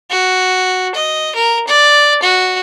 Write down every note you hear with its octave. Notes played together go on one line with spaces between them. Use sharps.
F#4
D#5
A#4
D5
F#4